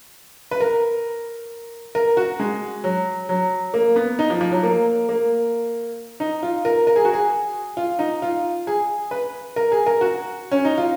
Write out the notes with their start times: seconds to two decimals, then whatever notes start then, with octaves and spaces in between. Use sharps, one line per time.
0.51 B4
0.60 A#4
1.95 A#4
2.17 F#4
2.40 G#3
2.84 F#3
3.29 F#3
3.74 A#3
3.96 B3
4.19 D#4
4.30 F3
4.41 F3
4.52 F#3
4.63 A#3
5.09 A#3
6.20 D#4
6.43 F4
6.65 A#4
6.87 A#4
6.96 G#4
7.05 F#4
7.13 G#4
7.77 F4
7.99 D#4
8.22 F4
8.67 G#4
9.11 B4
9.56 A#4
9.72 G#4
9.86 A#4
10.01 F#4
10.51 C#4
10.65 D#4
10.78 F4